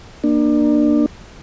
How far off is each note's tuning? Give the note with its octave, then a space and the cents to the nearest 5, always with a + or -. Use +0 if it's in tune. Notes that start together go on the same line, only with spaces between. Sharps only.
A#3 +15 D4 +25